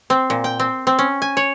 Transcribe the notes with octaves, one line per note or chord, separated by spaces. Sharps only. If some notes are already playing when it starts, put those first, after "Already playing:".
C4
A#2
G5
C4
C4
C#4
G#5
C#5